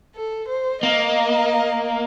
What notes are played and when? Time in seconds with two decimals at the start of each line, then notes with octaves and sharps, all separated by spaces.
0.16 A4
0.49 C5
0.83 A#3 D#5